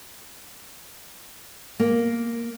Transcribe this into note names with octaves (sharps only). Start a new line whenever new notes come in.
A#3